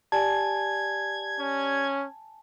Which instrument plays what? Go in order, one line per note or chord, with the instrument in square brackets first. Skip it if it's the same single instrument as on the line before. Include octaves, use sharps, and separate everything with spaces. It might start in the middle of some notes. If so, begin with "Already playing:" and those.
[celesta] G4 D5 [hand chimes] G#5 A5 [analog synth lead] G#6
[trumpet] C#4